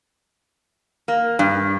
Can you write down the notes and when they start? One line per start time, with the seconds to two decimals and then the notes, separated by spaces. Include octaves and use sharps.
1.08 A#3
1.39 G2